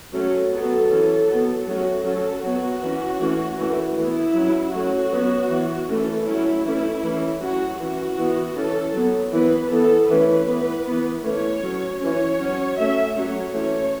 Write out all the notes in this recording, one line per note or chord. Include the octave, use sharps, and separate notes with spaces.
F#3 A3 C#4 A4
F#3 B3
E3 C#4
F#3 B3
F#3 A3 C#4 F#4
F#3 C#4 A4
F#3 B3 F#4
E3 C#4
E3 A3 C#4
E3 A3 C#4
E3 B3 E4
F#3 C#4
F#3 A3 C#4 F#4
F#3 B3
E3 B3
E3 A3 C#4 A4
F#3 A3 C#4 E4
E3 A3 C#4
E3 A3 C#4
F#3 C#4 F#4
E3 C#4 F#4
E3 B3
E3 C#4 A4
F#3 B3
E3 B3 B4
E3 B3 A4
E3 A3 C#4 B4
E3 B3
E3 B3
E3 A3 C#4 C#5
F#3 C#4
E3 C#4 C#5
F#3 C#4
F#3 A3 C#4 E5
F#3 A3 C#4 C#5
E3 A3 C#4 C#5